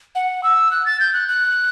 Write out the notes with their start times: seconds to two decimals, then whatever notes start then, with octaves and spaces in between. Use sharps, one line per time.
0.15 F#5
0.43 E6
0.71 F#6
0.86 A6
1.00 G6
1.13 F#6
1.28 F#6